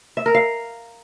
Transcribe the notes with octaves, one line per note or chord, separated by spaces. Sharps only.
E5
A#4
F5